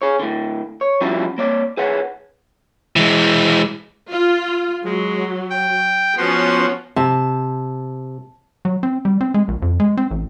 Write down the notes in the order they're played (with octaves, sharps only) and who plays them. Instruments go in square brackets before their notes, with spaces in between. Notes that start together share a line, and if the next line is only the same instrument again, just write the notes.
[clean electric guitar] G#4 C#5
A2 D3
C#5
F3 G3 C#4 D4 E4 F#4
A#3 C#5 D5
G#4 B4 C#5 F#5
[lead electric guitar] E3 G#3
[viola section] F4
[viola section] F#3 [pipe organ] G#3
[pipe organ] G5
[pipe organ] F3 F#4 C6 [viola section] B3 C#4
[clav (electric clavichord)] C3 [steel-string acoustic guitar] A5
[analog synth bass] F#3
C4
G3
C4
G#3
A#1
F2
G#3
C4
A1